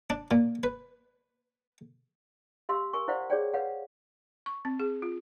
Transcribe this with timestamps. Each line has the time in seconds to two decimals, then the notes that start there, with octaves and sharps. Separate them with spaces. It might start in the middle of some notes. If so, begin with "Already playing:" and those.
0.10 D4
0.31 A#2
0.63 B4
2.69 G4 F5 C6 E6
2.93 A#4 G#5 C#6
3.08 E4 C5 D5 F5 F#5
3.30 G#4 C#5 D5 G5
3.54 B4 C#5 F5 F#5
4.46 C#6
4.65 C4
4.80 G#4
5.02 F4